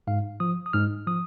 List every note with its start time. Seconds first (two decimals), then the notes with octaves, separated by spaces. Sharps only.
0.07 G#2 F5
0.40 F3 D#6
0.66 D#6
0.73 G#2 F6
1.07 F3 D#6